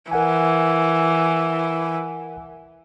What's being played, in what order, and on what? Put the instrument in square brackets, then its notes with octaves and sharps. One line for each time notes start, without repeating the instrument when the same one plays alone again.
[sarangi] E3 [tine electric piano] A#4 F#5 G#5